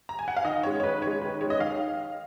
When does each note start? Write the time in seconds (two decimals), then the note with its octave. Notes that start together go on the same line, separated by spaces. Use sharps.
0.09 A#5
0.19 G#5
0.28 F#5
0.37 F5
0.45 D#3 D#5
0.63 G#3 C#4 C#5
0.80 C#5
0.84 D#3 B4
1.02 G#3 C#4 C#5
1.22 D#3 B4
1.41 G#3 C#4 C#5
1.50 D#5
1.60 D#3 F5